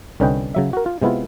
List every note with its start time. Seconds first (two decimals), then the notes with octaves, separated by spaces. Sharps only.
0.20 C2 D3 C#4 B4 D#5 G5
0.55 C#3 F#3 E5
0.73 F#4 A#4
0.86 F4
1.02 C3 G#3 B3 E4 F4